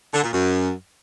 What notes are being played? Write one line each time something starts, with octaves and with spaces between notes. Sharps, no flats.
D3
A#2
F#2